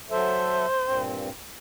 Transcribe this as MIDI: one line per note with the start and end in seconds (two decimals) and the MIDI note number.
0.10 0.65 54
0.10 0.65 69
0.10 1.12 72
0.10 0.65 76
0.84 1.29 43
0.84 1.29 46
0.84 1.29 60